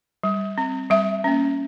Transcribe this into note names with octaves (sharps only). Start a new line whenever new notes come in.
G3
C4
G3 E5
A#3 C#4